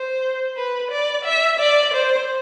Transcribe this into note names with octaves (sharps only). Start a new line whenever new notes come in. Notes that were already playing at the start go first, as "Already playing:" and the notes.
Already playing: C5
B4
D5
E5
D5
C5